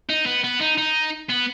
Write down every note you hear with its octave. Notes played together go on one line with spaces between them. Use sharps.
D#4
B3
B3
D#4
D#4
B3